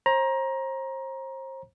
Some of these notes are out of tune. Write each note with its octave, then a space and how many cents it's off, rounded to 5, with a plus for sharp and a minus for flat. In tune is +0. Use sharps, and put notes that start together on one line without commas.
C5 +35 A#5 +20